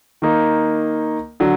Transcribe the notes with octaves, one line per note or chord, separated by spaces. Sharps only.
D#3 A#3 D#4
D3 F#3